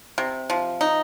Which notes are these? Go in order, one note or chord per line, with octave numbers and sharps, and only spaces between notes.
C3
F3
D#4